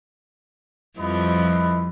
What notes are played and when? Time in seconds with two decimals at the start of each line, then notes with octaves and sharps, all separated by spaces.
0.98 F2 F3 G3 E4 B4 D#5